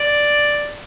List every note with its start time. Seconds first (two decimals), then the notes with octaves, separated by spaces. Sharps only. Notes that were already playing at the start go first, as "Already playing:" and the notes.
Already playing: D5